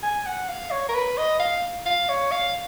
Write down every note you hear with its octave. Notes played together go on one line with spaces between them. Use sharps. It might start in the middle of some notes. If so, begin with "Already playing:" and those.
G#5
F#5
F5
C#5
A#4
B4
D#5
F5
F5
C#5
F5